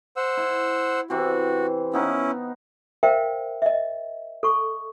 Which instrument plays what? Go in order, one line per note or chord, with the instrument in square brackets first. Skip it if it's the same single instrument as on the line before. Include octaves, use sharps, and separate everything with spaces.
[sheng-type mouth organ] C5 F#5 E6
[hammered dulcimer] E4
[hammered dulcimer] C3 E3 C4 [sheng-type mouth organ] F#4
[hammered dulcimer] B3 D#4 F5 [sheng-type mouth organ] C#4 E4
[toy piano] A#4 C5 E5 F5 G5
D#5 E5
A4 C#6